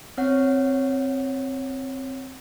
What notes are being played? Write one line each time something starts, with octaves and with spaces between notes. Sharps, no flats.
C4 C#5 F#5